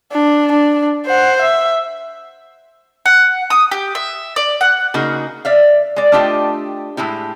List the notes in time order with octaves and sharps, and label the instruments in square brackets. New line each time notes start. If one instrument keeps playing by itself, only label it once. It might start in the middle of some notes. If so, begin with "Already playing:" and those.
[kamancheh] D4
D4
C5 F#5
E5
[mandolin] F#5
D#6
G4
E5
D5
F#5
[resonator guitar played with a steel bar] C#3 A#3 D#4 F#4 G#4
D5 E5 F5
G#3 D5
A3 D4 F4 G4 D#5 G5
A2 G#3 E4 G4